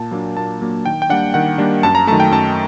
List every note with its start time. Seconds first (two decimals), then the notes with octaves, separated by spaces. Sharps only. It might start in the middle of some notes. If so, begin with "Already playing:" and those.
Already playing: A#2 A5
0.11 F#3 A#3 D4
0.37 A#2 A5
0.61 F#3 A#3 D4
0.85 D#3 G5
1.02 G5
1.09 G3 A#3 D4 F#5
1.34 D#3 F#5
1.58 G3 A#3 D4
1.83 F#2 A5
1.95 A#5
2.07 D#3 F#3 A3 A5
2.20 G5
2.31 F#2 A5